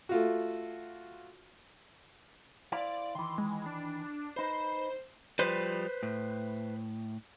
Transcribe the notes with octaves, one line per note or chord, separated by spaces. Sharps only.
A3 F4 F#4
E4 C5 D5 F5
D#3 E3 C6
G#3
D4
D#4 B4 C5
F3 G3 B4 C5
A2